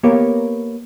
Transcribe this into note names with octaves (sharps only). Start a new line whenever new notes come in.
A#3 B3 G4 A#4 C#5